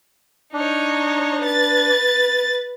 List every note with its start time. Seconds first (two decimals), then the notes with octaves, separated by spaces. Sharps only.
0.53 D4 D#4 C#5
1.41 B4 A6